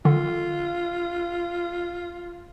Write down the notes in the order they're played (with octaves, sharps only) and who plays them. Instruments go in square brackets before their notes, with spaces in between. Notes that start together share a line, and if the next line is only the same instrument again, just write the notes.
[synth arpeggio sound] D3 [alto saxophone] F4